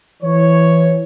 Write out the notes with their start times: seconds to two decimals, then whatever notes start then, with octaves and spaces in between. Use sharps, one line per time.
0.23 E3 C#5